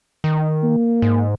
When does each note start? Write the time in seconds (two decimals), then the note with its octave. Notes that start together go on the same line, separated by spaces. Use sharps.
0.24 D#3
0.64 A#3
1.02 G#2